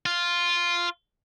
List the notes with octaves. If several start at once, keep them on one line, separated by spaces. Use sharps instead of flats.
F4